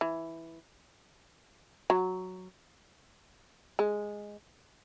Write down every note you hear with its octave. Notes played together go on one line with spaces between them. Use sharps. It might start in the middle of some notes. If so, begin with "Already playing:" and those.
E3
F#3
G#3